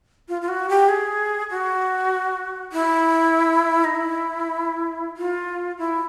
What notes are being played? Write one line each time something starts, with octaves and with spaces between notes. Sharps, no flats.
F4
F4
F#4
G4
G#4
F#4
E4
D#4
E4
F4
E4